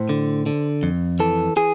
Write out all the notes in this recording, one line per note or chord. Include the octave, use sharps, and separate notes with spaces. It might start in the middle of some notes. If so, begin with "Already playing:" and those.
Already playing: A2 C5
D3
D3
F2
E3 A4
E3 G#4